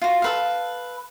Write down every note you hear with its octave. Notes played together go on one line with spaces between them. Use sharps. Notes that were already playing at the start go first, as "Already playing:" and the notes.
F4 F#4
A4 B4 F5